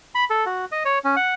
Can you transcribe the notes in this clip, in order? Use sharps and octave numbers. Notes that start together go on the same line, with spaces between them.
B5
A4
F#4
D#5
C#5
C#4
F#5